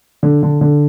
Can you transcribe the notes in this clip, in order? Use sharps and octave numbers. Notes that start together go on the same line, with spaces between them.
D3
D3
D3